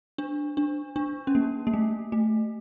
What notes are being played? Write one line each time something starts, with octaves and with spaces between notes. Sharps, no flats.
D4
D4
D4
C#4
A#3
A#3
A3
A3